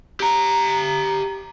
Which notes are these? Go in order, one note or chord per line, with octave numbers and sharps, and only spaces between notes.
G4 A#5